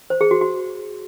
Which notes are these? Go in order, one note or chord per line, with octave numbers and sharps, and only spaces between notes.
C5
G#4
F#4
F#4